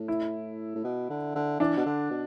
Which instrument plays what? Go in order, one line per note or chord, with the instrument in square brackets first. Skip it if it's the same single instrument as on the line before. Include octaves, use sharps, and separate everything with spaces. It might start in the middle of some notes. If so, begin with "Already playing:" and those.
Already playing: [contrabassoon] A2
[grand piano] E4
[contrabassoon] A2
B2
D3
D3
[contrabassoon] E3 [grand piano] D4
[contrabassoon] B2
D3
B2